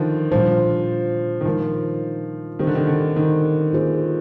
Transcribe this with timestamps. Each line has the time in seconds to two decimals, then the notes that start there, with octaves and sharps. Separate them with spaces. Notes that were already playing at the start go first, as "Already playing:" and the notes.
Already playing: D3 D#3 F3
0.32 A#2 F3 G3 D4 F4 C5
1.41 D#3
1.45 A#2 F3 G#3 D#4 A#4
2.59 D#3 G3 C4 G4 C5
2.67 D3
2.75 D#3
2.87 D3
3.16 D#3
3.72 A#3 F4 G#4 C5